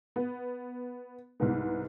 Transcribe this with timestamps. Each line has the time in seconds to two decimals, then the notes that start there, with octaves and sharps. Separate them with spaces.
0.16 B3
1.40 C2 G#2 B3